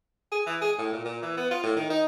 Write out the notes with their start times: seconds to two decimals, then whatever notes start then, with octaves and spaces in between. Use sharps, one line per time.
0.32 G#4
0.46 E3
0.62 G#4
0.78 A2
0.93 A#2
1.05 A#2
1.22 E3
1.37 B3
1.51 F4
1.63 A2
1.77 D#3
1.90 D#4